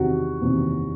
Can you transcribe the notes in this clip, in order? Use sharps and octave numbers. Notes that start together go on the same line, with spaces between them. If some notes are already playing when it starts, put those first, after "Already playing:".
Already playing: E2 C3 D#3 F#4
E2 C3 D#3